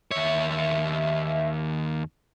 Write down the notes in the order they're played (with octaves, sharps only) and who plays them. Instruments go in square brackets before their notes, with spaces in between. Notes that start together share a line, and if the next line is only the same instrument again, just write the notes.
[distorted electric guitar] D#2 C#5 [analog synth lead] E5